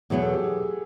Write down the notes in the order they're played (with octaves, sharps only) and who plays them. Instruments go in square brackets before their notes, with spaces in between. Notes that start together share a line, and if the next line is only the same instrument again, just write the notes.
[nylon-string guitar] E2 B2 F#3 B3 [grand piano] G#4
[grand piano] A4
G4
G#4